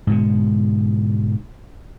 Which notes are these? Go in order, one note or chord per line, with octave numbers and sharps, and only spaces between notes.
G#2 B2 D3